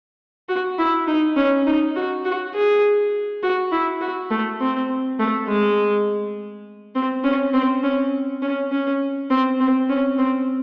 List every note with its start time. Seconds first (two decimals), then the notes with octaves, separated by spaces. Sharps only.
0.49 F#4
0.79 E4
1.07 D#4
1.36 C#4
1.66 D#4
1.96 F#4
2.25 F#4
2.55 G#4
3.43 F#4
3.72 E4
4.01 F#4
4.31 A3
4.61 C4
5.19 A3
5.48 G#3
6.95 C4
7.24 C#4
7.54 C4
7.84 C#4
8.42 C#4
8.71 C#4
9.30 C4
9.60 C4
9.89 C#4
10.18 C4